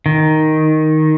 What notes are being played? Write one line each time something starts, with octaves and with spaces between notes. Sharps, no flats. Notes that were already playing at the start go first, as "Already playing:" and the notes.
D#3